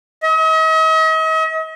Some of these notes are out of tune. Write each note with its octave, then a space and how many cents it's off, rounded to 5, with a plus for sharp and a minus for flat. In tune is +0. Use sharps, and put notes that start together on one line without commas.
D#5 +40